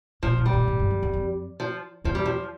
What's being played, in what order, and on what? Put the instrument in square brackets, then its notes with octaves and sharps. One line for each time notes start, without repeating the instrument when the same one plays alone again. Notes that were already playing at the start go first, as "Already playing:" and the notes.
[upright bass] A#2 [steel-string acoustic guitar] F3
[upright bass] A#2
[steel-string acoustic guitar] G3
[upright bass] A#2
A2
G2
F2
E2
F2
[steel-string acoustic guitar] F3
[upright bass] E2 [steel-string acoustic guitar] F3
[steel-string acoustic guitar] G3
F3